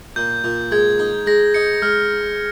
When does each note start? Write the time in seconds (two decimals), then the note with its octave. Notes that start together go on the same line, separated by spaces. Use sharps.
0.16 A#2 G6
0.44 A#2
0.71 G#3 G#6
0.99 D#4
1.26 G#3 A#6
1.54 D#4 C#7
1.82 G#3 F6